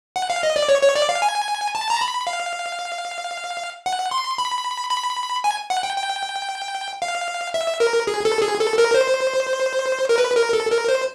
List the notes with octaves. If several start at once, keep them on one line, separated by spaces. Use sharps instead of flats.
F#5
F5
D#5
D5
C#5
C#5
D5
F5
G#5
A5
A#5
B5
F5
F#5
C6
B5
B5
G#5
F#5
G5
G5
F5
E5
A#4
G#4
A4
G#4
A4
A#4
C5
A#4
B4
A#4
A4
A#4
C5